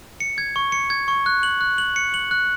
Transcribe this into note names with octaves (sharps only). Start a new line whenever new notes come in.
C#7
G#6
C#6
C#7
G#6
C#6
F#6
F#7
F#6
F#7
C#7
F#7
F#6